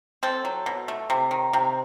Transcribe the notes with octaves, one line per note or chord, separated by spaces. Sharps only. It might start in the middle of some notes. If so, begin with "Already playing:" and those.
C4 A4
F#3
B2
A3
C3
D#3
C3